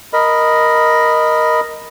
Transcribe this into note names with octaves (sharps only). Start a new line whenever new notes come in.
A#4 D#5 B5